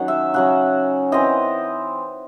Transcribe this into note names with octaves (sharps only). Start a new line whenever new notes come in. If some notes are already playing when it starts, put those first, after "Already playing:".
Already playing: D#3 F#3 C#4 F#5
E5
C#3 F#3 C#4 F#5
E3 C4 D#5